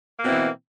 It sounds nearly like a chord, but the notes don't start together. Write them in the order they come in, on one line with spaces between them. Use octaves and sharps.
A#3 B2 C4 E4 E3